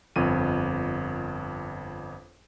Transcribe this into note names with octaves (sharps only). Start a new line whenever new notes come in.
G1 F2 D#7